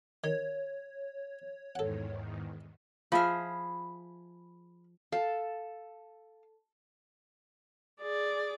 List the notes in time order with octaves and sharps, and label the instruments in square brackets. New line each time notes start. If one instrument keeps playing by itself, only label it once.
[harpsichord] D#3 [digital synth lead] C#5
[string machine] E2 G#2 D#3 [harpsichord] A4 F#5
[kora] F3 G#4 E5 [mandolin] B5 F6
[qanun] A4 [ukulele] F5
[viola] G#4 D5